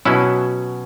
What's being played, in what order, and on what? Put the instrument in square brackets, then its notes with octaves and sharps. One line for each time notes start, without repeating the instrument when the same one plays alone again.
[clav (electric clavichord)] B2 F#3 C#4 E4